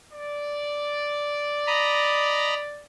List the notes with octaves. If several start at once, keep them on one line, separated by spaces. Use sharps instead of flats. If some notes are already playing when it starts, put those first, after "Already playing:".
D5
D#5 A#5 B5